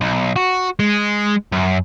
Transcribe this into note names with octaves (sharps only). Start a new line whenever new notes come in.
B1
F#4
G#3
F#2